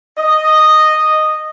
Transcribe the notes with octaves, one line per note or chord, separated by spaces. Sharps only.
D#5